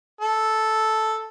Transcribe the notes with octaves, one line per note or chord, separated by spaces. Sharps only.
A4